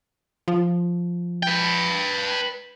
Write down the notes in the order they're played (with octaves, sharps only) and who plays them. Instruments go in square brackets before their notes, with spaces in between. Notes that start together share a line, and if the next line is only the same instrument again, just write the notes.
[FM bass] F3
[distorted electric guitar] B4 G5